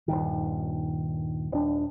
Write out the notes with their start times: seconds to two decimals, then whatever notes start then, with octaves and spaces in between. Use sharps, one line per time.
0.08 D#1 B1 G2 D#3
1.52 D#1 D4